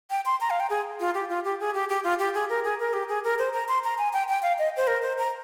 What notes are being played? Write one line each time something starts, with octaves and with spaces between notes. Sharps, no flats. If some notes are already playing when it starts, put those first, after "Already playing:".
G5
C6
A#5
F5
G5
G#4
F4
G4
F4
G4
G#4
G4
G4
F4
G4
G#4
A#4
G#4
A#4
G4
G#4
A#4
C5
A#5
C6
A#5
G#5
G5
G5
F5
D#5
C5
A#4
C5
A#5